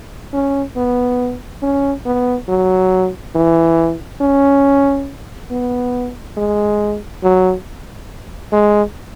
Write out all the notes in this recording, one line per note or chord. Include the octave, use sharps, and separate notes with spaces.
C#4
B3
C#4
B3
F#3
E3
C#4
B3
G#3
F#3
G#3